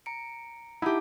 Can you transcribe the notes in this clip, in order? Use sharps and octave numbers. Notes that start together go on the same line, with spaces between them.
A#5 C#7 D7
D#4 E4 G4 F#5 A5